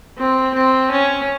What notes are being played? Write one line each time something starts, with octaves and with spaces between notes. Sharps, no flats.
C4
C4
C#4